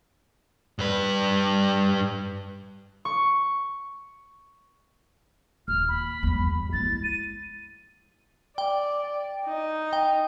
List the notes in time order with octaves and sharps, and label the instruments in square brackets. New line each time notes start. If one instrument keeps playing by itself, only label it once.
[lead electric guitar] G2 B4
[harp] C#6
[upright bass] D#1 [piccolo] F6
[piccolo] B5
[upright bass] E2 G2
[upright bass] G#3 E4 [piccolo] A6
[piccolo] D#7
[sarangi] D5 [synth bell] G5
[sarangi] D#4
[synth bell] G5